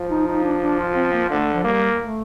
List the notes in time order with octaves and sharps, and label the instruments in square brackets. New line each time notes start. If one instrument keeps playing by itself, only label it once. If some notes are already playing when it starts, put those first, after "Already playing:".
Already playing: [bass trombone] F3
[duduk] D#4
D#4
D4
D4
F4
C4
A#3
[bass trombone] D3 [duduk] A3
[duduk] F3
[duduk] G3 [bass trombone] A#3
[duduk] A3